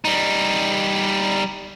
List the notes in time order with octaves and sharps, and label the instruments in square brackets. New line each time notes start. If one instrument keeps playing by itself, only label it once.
[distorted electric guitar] G3 D#4